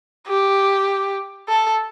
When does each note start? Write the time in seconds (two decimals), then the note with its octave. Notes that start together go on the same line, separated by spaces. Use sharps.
0.28 G4
1.49 A4